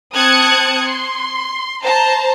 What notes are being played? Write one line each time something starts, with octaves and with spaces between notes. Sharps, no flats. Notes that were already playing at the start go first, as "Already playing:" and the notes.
C4 A5 D#6 F#6 G#6 C#7
C6
C5 A5 A#5